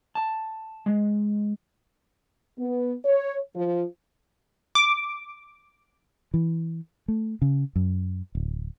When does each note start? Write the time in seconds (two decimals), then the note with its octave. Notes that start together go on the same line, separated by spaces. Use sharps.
0.15 A5
0.86 G#3
2.59 B3
3.05 C#5
3.55 F3
4.75 D6
6.34 E3
7.08 A3
7.42 C#3
7.76 F#2
8.35 D1